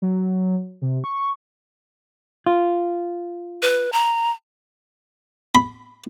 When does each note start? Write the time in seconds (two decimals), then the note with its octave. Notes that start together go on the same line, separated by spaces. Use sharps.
0.02 F#3
0.82 C3
1.04 C#6
2.46 F4
3.62 B4
3.92 A#5
5.55 B5